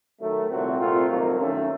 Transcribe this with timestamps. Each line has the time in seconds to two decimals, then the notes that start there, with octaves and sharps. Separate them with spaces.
0.20 D#3 F#3 A3
0.49 C2 A#2 A3 C4 F#4
0.79 C2 A#2 A3 C4 F4
1.08 C2 C3 D#3 F#3 A#3
1.37 F#2 D#3 A3 C#4